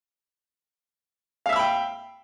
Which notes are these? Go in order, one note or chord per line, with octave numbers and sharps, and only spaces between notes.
E5 F5 G5 B5 E6